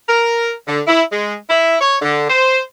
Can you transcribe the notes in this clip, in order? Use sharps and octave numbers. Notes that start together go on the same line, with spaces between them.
A#4
D3
E4
G#3
E4
C#5
D3
C5